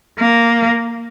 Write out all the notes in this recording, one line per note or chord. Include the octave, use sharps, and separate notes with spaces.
A#3